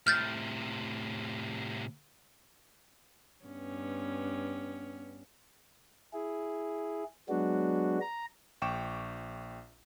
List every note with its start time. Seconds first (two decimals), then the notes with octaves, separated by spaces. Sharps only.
0.07 A2 C3 F6 G6 A6
3.45 G2 B3 C#4
6.13 E4 G#4
7.29 F#3 G#3 B3 D4 F#4
8.01 A#5
8.62 A#1 G5 C#6 D6 E7